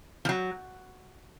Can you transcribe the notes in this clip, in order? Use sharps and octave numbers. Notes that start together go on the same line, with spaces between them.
F3
F#3